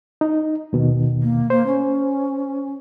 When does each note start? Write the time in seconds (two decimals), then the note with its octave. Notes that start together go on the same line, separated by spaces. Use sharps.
0.21 D#4
0.73 D#2 B2 D#3
1.22 A#3
1.50 A#3 C5
1.66 C#4